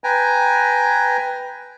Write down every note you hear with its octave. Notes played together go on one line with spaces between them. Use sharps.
B4 G5 G#5 A#5